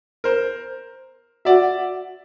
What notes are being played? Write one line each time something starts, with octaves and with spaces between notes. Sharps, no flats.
A#4 C5
F#4 D5 E5